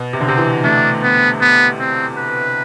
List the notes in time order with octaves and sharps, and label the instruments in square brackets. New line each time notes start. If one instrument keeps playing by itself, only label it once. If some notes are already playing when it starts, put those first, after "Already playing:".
Already playing: [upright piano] B2
C3
D3
[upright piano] C3 [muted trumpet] C4
[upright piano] E3
[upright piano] A3 [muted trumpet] D4
[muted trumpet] B3
B3
C4
B4